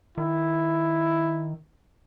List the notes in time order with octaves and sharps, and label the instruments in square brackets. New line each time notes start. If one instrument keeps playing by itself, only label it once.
[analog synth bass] D#3 [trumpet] E4